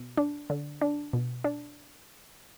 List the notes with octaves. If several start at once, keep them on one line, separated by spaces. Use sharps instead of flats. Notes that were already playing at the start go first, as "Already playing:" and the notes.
Already playing: B2
D4
D3
D4
B2
D4